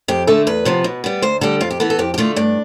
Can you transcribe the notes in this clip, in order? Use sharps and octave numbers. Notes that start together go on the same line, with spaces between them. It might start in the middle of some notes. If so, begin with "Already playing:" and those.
F2 G4
D3 A3 A4
E2 B4
C3 F3 B3
B2
G3 B3
D2 C5
D3 G3 A4
F2 F4
G4
E3 B3 A4
A4
F2 G4
G4
D3 A3 F4
G2 D4